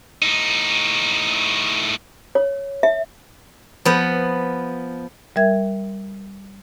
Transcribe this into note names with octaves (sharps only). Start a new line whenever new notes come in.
A2 D#4
C#5
E5
F3 B3
G3 A#4 E5 G#6